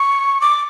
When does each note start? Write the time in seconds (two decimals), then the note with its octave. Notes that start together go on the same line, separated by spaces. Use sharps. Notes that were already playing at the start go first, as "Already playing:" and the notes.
Already playing: C#6
0.41 D6